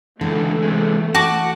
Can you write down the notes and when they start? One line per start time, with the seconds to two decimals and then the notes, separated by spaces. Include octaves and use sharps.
0.21 C#2 D3 E3 A3
0.62 C3 G#3
1.15 F#4 F#5 A5 D6